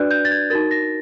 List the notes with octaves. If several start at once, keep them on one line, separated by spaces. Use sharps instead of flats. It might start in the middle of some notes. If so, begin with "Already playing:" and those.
Already playing: D4 F#4 B4 D5 F#6
G6
A6
G#6
D#4 F#4 A#4 A6
A#6